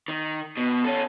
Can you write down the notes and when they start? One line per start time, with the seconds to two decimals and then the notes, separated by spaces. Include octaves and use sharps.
0.08 D#3
0.57 B2
0.84 C#4 A4